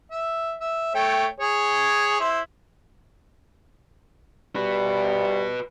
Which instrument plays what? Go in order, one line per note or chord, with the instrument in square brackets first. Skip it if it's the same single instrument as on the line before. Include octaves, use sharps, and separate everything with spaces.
[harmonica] E5
E5
A3 C#5 G5
G#4 C#5
E4 C5
[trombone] G3 [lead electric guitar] F#4 B4